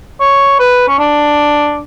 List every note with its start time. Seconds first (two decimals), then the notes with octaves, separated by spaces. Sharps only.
0.20 C#5
0.59 B4
0.88 C#4
0.99 D4